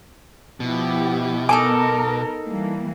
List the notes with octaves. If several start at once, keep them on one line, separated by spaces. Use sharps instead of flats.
B2 F3 E4 G4
B3 D#4 A4 A#4 G#5 D6
E3 G3 A#3